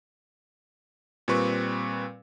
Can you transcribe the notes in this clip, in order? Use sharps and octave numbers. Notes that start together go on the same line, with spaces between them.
A#2 G3 C4 B4 C#6